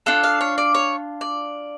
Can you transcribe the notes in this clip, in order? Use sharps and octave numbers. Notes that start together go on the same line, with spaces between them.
D4 F4 A4 F#5
F5
C#5
D5
C#5
D5